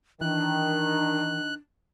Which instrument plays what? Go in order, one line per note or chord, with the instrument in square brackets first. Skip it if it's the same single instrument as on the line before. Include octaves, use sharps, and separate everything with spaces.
[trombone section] D#3 [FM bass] E3 [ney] D4 [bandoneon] F#6